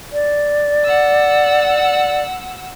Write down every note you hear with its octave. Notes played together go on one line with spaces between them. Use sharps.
D5
F#5 E6